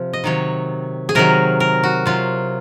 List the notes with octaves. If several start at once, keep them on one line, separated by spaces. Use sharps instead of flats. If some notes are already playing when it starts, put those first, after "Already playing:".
Already playing: C3 F3
D#5
C3 D#3 F#3 C#5
G#4
C3 D#3 F#3 A#4
A#4
F#4
C3 F#3 F4